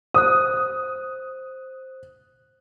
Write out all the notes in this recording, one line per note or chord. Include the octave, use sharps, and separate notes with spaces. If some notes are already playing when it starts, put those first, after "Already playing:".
C5 D#6 F#6